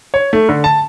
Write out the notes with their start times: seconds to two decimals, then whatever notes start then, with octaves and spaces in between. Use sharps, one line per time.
0.14 C#5
0.33 A3
0.49 D3
0.64 A5